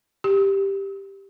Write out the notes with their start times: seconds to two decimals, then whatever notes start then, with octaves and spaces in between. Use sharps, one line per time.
0.24 G4